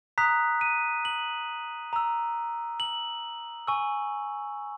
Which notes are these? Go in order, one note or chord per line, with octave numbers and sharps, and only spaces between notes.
A#5 D#6 F#6 B6
D#7
F#7
A#5 E6
F#7
G#5 C#6 E6